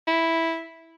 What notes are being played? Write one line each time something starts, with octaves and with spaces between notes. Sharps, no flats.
E4